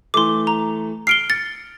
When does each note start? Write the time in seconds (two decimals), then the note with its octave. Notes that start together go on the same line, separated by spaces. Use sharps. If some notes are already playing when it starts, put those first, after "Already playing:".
0.14 E3 A3 C6 D6
0.47 A#5
1.07 F6 C7 D7 G7
1.30 A6 C#7